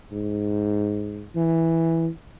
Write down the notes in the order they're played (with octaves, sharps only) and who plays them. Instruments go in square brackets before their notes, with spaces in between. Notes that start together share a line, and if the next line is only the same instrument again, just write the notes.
[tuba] G#2
E3